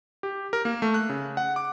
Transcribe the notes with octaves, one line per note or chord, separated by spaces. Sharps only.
G4
A#4
A#3
A3
F#6
C#3
F#5
D6